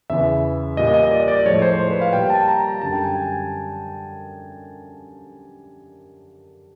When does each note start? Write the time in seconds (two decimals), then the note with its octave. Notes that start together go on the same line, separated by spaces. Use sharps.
0.10 E2 C#3 E3 E5
0.77 A#2 G3 D#5
0.94 D#5
1.11 D5
1.20 D#5
1.28 D5
1.45 A2 F3 G#3 C#5
1.62 C5
1.80 C5
1.91 B4
2.01 F5
2.13 A#2 G3 G5
2.30 A5
2.48 A#5
2.68 A#5
2.81 F#2 D3 G3 A5
2.93 G5
3.04 G#5
3.15 G#5